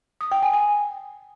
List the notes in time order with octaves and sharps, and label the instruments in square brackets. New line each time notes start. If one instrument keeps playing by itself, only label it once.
[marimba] D#6
G5
G#5
G#5